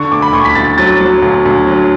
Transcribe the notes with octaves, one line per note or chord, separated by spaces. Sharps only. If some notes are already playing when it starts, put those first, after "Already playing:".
Already playing: D3 C#6
D2 D6
B5
D2 C#6
B6
D2 A6
F#3 A6
F#3
D2
D2
F#3